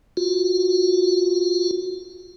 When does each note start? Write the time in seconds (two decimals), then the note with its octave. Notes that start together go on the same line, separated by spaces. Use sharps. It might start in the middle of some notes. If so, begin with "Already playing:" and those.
0.17 F4 F#4